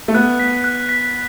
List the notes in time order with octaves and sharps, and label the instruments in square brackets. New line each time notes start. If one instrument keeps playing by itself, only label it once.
[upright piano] A3
[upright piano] B3 [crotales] F#6
[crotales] B6
F#6
B6